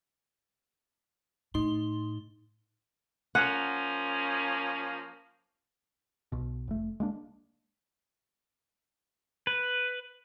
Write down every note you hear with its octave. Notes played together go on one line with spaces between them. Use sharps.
A2 D#4 C6 G7
F3 A#3 C#4 F#5
B1 B2
F1 A3
G#3 A#3 D4
B4